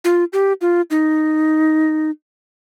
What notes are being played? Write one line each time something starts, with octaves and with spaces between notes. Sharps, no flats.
F4
G4
F4
D#4